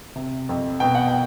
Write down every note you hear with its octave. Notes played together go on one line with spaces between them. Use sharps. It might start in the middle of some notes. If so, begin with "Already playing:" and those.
C3
F2
B2 G5
F#5
G5